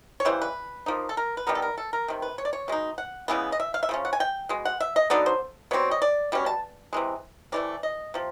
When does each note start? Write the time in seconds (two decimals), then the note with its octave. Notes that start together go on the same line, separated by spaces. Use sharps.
0.20 C#5
0.25 C#3 E3 G3 C5
0.41 B4
0.86 F3 A#3 D#4
1.09 A4
1.17 A#4
1.37 B4
1.47 D#3 G3 B3 A#4
1.55 A4
1.62 A#4
1.78 A4
1.93 A#4
2.08 C3 D#3
2.22 B4
2.38 C#5
2.45 D5
2.53 C#5
2.68 B2 G#3 D#4
2.98 F#5
3.28 C#3 E3 G#3 B3
3.52 D#5
3.60 E5
3.74 F5
3.83 E5
3.89 C#3 F3 C#4
4.05 F#5
4.13 G#5
4.20 G5
4.49 B2 G#3
4.65 F#5
4.80 E5
4.96 D#5
5.10 D3 F#3 B3 D#4 D5
5.26 C5
5.71 B2 G3 C4 C#5
5.91 D#5
6.02 D5
6.32 B2 G3 C#4
6.46 A5
6.93 C3 E3 G#3
7.52 C3 E3 A3 D5
7.83 D#5
8.14 C3 F3